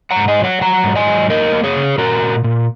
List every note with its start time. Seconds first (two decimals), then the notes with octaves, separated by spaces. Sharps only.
0.11 F#5 A#5
0.16 G#2
0.28 D#5 G#5
0.39 F#3
0.44 C#5 F#5
0.61 F#3 F#5 A#5
0.84 G#2
0.95 D#5 G#5
1.07 F#3
1.30 A#3 A#4 D#5
1.52 A#3
1.64 G#4 C#5
1.76 C#3
1.98 A#2 F#4 A#4
2.22 A#2
2.44 A#2